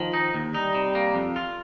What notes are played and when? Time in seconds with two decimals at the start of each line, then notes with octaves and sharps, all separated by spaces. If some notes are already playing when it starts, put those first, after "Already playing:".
Already playing: D#3 F3
0.13 D#4
0.34 D#2
0.54 G3 D#4
0.75 C3
0.95 A#3
1.15 F2
1.36 F4